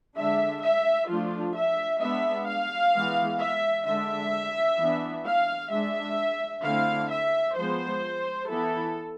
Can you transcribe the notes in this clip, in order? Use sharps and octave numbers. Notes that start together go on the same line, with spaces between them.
D3 G#3 D4 E5
E5
F3 A3 D4 F4
E5
G#3 B3 D4 E5
F5
E3 G#3 B3
E5
D3 G#3 D4 E5
E3 B3 D4
F5
G#3 D4 E5
D3 A3 C4 E4 F5
E5
F3 G#3 B3 C5
E3 B3 E4 A4